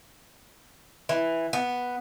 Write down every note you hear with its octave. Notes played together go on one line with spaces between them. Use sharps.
E3
B3